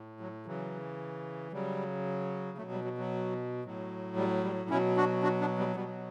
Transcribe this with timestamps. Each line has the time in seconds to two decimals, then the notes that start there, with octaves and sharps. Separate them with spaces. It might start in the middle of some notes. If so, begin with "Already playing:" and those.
Already playing: A2
0.20 F#3
0.46 C#3 E3 F#3
1.52 C#3 F#3 G3
2.58 F#3 A3
2.62 B2
2.71 G3
2.84 F#3
2.98 F#3
3.64 A2 F#3
4.16 G3
4.44 G3
4.70 B2 F#3 C#4 E4
4.97 D4 F#4
5.23 D4 F#4
5.40 B3 D4
5.58 G3 B3
5.76 B2 G3 B3
5.80 F#3